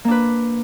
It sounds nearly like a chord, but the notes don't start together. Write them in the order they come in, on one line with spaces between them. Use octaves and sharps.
A#3 D4 B4